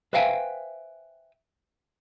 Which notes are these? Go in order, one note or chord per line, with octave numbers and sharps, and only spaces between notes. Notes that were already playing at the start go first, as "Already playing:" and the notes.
B4 C5 E5 F5 G5 G#5